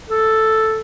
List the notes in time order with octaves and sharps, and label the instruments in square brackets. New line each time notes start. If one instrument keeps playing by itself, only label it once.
[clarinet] A4